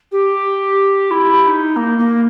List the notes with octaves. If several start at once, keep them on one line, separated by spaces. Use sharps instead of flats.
G4
E4
E4
D#4
A#3
A#3